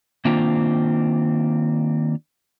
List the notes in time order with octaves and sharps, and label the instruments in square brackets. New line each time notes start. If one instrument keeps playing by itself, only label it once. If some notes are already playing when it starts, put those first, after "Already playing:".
[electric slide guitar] D#3 A#3 C4 D4 F4